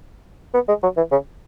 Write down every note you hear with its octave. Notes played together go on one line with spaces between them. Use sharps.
B3
G#3
F#3
E3
C#3